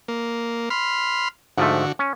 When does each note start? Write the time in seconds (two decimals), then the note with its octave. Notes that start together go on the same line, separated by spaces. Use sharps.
0.08 A#3
0.70 B5 C6 F6
1.58 G#2 D3 F3 A3 F#4
1.99 C#4